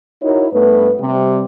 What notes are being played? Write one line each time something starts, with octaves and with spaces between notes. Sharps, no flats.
D#4 E4 F#4 A#4 C#5
G2 A3 B3 B4
C3 G3